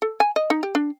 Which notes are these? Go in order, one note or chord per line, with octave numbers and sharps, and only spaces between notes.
A4
G#5
D#5
D#4
G4
D4